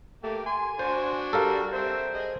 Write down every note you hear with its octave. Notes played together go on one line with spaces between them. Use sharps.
A3 A#3 G4
G#5 C6
D4 F#4 C5
G3 A4 A#4 F5
C4 C5 E5
G#4 D#5